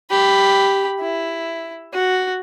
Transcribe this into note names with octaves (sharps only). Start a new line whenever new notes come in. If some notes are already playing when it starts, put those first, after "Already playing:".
G4 B5
E4
F#4